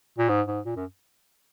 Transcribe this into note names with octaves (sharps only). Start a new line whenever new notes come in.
A#2
G#2
G#2
A#2
F#2